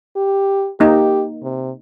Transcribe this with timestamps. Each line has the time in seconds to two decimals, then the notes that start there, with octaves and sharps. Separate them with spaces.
0.17 G4
0.80 A#3 D#4 G4
1.43 C3